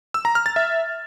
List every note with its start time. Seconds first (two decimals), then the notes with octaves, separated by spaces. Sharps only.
0.14 E6
0.25 A#5
0.35 F6
0.46 A6
0.56 E5